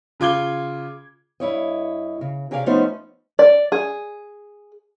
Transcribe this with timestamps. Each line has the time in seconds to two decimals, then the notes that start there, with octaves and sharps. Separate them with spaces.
0.20 C#3 F4 D6 G#6 G7
1.40 G2 E4 C#5 D#5
2.21 C#3
2.51 C3 C#4 G#4 D5 F5
2.66 F3 A3 B3 C#4 D#4 C5
3.39 D5
3.72 G#4